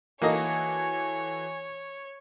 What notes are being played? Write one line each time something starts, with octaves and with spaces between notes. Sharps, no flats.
E3 A#3 F#4 A4 C#5 D#5 G#5